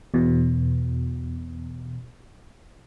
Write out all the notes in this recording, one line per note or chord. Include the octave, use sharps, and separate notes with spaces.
E2 B2